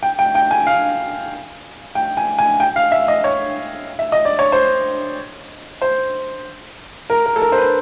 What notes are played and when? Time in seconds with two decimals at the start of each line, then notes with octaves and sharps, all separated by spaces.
0.03 G5
0.19 G5
0.35 G5
0.51 G#5
0.67 F5
1.95 G5
2.17 G#5
2.39 G#5
2.60 G5
2.76 F5
2.92 E5
3.08 D#5
3.24 C#5
3.99 E5
4.12 D#5
4.25 D5
4.39 C#5
4.52 C5
5.82 C5
7.10 A#4
7.26 A#4
7.36 A4
7.42 A#4
7.52 C5
7.58 B4